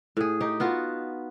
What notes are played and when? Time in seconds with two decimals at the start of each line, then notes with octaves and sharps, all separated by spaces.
0.17 A2 G#4
0.41 D#4 G4
0.60 B3 F4 F#4